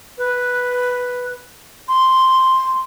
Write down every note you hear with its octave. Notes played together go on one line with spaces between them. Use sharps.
B4
C6